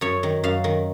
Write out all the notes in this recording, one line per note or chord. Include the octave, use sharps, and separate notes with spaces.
F#2 C#5
D#3
F#2 F5
D#3